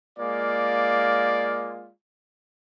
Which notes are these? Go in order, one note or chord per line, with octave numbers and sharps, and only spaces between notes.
G#3 A#3 F4 D5